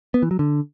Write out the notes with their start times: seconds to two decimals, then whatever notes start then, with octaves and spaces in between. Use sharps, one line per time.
0.14 B3
0.22 E3
0.31 F#3
0.39 D3